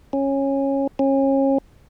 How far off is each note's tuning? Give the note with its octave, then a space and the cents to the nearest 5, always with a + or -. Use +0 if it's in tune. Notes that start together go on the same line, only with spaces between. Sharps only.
C#4 -15
C#4 -30